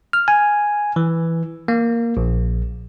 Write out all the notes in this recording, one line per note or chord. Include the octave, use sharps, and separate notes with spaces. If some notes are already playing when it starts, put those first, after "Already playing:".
F6
G#5
E3
A#3
A#1